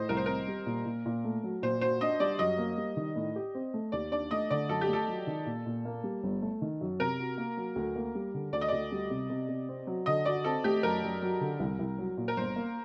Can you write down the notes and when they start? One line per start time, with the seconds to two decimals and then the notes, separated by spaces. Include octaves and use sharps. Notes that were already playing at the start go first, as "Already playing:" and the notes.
Already playing: A2 C5 D#5
0.09 C2 A#4
0.17 C5
0.26 C4 A#4
0.48 G3
0.66 A#2
0.85 A#2
1.06 A#2
1.24 A3
1.43 F#3
1.62 A#2 C5
1.81 F#4 C5
2.01 D4 D#5
2.20 G3 D5
2.39 F#2 D#5
2.58 A#3
2.78 G3
2.97 D#3
3.16 A2
3.36 G4
3.55 C4
3.74 A3
3.92 D#2 D5
4.12 D4 D5
4.31 A3 D#5
4.50 D3 D5
4.69 F#2 A4
4.81 G4
4.88 A3 A4
5.08 F#3
5.27 D#3
5.46 A#2
5.66 A#2
5.85 A#3
6.04 G3
6.24 G1
6.42 A3
6.61 D#3
6.81 F#2
6.99 C3 A#4
7.19 F#4
7.38 A#3
7.57 F#3
7.76 D2
7.96 A#3
8.15 G3
8.34 D3
8.53 D2 D5
8.61 D#5
8.68 D2 D5
8.92 G3
9.10 C3
9.30 C3
9.49 C3
9.69 C4
9.87 F#3
10.06 D3 D#5
10.25 F#4 D5
10.44 C4 A4
10.64 A3 G4
10.83 F#2 A#4
11.03 F#2
11.22 F#3
11.41 D3
11.60 C2
11.79 C2
11.98 F#3
12.17 A#2
12.28 A#4
12.36 G1 C5
12.56 A#3